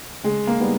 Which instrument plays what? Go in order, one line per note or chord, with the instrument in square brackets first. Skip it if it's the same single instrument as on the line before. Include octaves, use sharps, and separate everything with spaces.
[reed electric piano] C#3 [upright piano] G#3
[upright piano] A#3
[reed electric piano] G3 B3 D#4